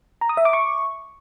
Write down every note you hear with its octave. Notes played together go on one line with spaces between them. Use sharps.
A#5
D#6
E5
D6
C#6